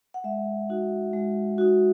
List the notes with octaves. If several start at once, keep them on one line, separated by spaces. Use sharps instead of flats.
F#5
G#3 E5
D#4 F#4
G#3
D#4 F#4